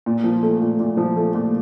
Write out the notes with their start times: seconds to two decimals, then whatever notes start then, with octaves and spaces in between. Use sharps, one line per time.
0.06 A#2
0.24 F3
0.43 A3
0.62 A#2
0.79 A#2
0.97 F3
1.16 A3
1.35 A#2